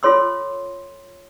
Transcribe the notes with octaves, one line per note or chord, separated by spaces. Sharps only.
F4 A4 C#5 C6 E6